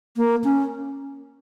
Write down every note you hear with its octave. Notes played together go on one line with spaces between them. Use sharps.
A#3
C#4